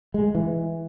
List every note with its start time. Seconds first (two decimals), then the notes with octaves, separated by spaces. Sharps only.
0.14 G#3
0.35 E3